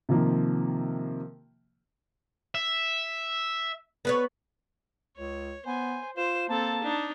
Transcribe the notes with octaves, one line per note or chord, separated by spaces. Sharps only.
C3 D#3 F3 A#3
E5
B3 B4 C#5
C#2 C#5
B3 C5 G#5
F4 C5 E7
A#3 C4 A4 A5
D4 D#4